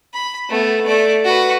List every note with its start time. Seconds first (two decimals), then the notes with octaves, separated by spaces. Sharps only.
0.14 B5
0.50 A3 B3
0.86 A3 D5
1.25 F#4 B4